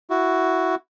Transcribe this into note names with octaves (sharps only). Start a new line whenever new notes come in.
E4 F#4